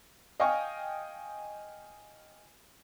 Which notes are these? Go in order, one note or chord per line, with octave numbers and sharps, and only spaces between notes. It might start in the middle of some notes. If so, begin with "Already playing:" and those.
D#5 F5 G5 G#5 C#6